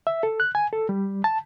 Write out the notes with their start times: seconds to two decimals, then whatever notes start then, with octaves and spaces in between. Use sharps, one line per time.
0.07 E5
0.23 A4
0.40 F#6
0.55 G#5
0.73 A4
0.89 G3
1.24 A5